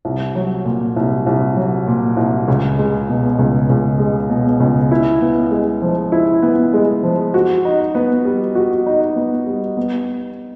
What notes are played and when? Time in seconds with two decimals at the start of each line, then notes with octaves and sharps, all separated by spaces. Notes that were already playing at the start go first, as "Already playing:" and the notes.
0.05 C2
0.35 F#3
0.65 A#2
0.96 C2
1.27 C2
1.57 F#3
1.88 A#2
2.17 C2
2.48 C#2
2.78 G#3
3.09 B2
3.39 C#2
3.70 C#2
3.99 G#3
4.30 B2
4.60 C#2
4.91 E4
5.21 B3
5.51 G#3
5.82 F3
6.12 E4
6.42 B3
6.74 G#3
7.03 F3
7.34 F#4
7.65 D#4
7.95 B3
8.25 G3
8.55 F#4
8.86 D#4
9.16 B3
9.46 G3
9.77 B3